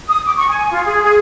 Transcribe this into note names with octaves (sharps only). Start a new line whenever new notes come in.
D#6
D6
C#6
G#5
F4
G#4
G#4